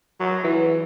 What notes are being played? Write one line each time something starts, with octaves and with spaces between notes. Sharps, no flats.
F#3
E3